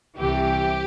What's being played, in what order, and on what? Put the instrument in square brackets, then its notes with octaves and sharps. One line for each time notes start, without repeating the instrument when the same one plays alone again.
[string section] C2 C3 E3 G4